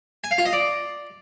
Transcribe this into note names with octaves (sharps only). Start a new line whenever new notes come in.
G#5
F5
F4
D#5
D5